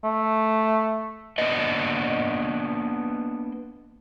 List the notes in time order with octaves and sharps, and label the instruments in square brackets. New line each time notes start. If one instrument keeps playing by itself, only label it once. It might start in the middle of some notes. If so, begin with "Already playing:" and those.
[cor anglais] A3
[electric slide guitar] A#3 B3 D4 D#5